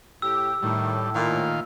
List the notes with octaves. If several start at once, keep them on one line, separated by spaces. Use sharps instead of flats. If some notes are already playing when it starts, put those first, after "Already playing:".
A2 G4 E6
A2 D#3 G3
A#2 D#3 F5